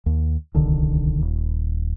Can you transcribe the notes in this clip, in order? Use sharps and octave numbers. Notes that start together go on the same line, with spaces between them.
D#2
D1 C2 D3 D#3
D#1